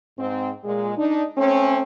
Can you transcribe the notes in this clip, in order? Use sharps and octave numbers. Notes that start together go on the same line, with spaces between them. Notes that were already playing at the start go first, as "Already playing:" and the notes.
G#2 C4
A#2 G#3
D4 D#4
A3 C4 C#4